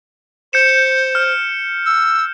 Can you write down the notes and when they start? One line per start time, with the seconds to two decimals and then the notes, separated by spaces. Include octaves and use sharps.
0.53 C5 G6 C#7 E7
1.15 F6
1.86 E6